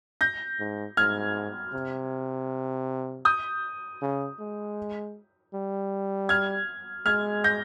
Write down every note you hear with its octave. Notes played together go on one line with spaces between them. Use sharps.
G6 A#6
G#2
G#2 F6 G#6
C3
D#6 G6
C#3
G#3
G3
F6 G#6
G#3 F6 G#6
G6 A#6